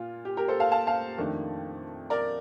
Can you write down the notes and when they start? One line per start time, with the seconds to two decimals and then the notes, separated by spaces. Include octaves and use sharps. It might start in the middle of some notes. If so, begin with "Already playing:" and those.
Already playing: A#2 F4
0.25 G4
0.37 G4 A#4
0.48 A4 C5
0.60 F5 A5
0.72 F5 A5
0.87 F5 A5
1.18 F2 D#3 A3 D4
2.10 A#4 D5